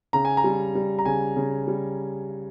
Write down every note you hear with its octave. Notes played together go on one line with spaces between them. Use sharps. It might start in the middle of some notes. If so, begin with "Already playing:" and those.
C#3 A#5
G#5
A#5
G3
G3
A#5
C#3 G#5
C#3
G3